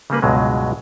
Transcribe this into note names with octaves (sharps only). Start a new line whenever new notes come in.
C#3 G3 A#3 B4
C#2 G2 B2 F#3 G#3